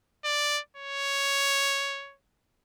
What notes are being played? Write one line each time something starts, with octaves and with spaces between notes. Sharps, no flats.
D5
C#5